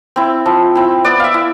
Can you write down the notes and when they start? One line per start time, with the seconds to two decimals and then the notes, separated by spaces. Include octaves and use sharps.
0.16 C4 E4
0.46 F3
0.75 C4 E4
1.05 B3 D5
1.20 E5 F5
1.34 E4